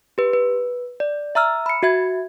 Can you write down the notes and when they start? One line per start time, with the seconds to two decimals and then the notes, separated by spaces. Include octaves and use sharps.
0.18 G4 B4
0.33 B4
1.00 D5
1.35 E5 A#5 E6 F6
1.66 B5 C#7
1.83 F#4 E5 G#6